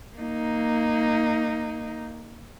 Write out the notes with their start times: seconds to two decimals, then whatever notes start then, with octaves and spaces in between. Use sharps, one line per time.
0.17 A#3 D#4